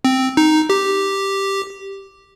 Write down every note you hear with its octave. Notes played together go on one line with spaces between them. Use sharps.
C4
D#4
G4